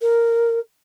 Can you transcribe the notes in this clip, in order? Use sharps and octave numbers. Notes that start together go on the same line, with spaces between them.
A#4